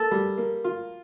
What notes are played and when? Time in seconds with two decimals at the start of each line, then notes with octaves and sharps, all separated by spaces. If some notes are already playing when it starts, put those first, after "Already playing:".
Already playing: A#3 A4
0.11 G3
0.38 A#3
0.64 F4